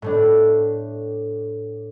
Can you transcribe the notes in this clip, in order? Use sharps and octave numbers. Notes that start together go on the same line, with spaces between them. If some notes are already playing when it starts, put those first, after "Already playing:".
A2 A3 D4